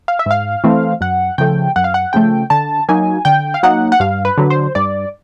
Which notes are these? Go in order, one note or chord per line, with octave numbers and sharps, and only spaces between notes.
F5
E5
G#2 F5
E3 A3 C4
F#2 F#5
C#3 F3 A3 G5
F#2 F#5
F5
F#5
C#3 F3 A3 G5
D3 A5
F#3 A#3 D#4 G#5
D3 G5
F5
F#3 A#3 D#4 F#5
F#5
G2 F5
B4
D3 F#3
C5
G2 D5